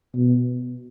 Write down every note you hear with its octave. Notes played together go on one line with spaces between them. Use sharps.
B2